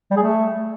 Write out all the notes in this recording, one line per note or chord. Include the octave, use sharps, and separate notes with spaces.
G3
G#4
A3